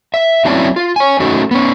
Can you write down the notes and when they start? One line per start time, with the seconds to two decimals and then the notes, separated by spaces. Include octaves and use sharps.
0.14 E5
0.45 F#3 C4 C#4 E4 D5 A5
0.76 F4
0.96 C#5 G#5
1.20 A3 C#4 D#4 F#4
1.51 B3 C#4